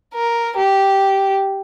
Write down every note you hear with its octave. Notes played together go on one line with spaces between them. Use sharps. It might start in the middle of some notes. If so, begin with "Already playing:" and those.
A#4
G4